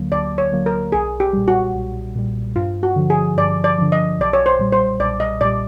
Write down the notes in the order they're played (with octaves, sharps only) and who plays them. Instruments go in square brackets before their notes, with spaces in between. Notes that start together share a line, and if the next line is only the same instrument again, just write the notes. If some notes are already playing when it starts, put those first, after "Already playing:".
Already playing: [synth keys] D2 D3 F#3 A#3
[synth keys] D2 [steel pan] D5
[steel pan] C#5
[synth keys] D3 F#3 A#3
[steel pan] A#4
[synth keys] B1 [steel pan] G#4
[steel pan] G4
[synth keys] A#2 G3
[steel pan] F#4
[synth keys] B1
A#2 G3
[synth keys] G2 [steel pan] F4
[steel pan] F#4
[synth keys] D3 F3
[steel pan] G#4
[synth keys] G2 [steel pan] D5
[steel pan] D5
[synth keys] D3 F3
[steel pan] D#5
[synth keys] B1 [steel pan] D5
[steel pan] C#5
C5
[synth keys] A#2 G3
[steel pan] C5
[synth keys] B1 [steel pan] D5
[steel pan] D#5
[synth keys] A#2 G3 [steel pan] D5